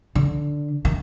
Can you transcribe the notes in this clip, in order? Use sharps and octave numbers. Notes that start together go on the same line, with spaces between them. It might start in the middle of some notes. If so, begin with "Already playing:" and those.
D3
D#3